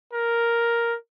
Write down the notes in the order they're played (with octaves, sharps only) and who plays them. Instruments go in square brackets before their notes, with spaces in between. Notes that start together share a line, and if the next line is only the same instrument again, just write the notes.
[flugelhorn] A#4